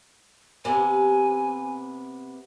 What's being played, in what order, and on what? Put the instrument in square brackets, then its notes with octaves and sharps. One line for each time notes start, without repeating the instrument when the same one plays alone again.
[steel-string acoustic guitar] C3 B3 [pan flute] G#5